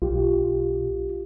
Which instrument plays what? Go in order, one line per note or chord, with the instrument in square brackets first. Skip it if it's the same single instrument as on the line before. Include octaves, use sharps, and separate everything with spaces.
[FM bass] B1 [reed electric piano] F4 G4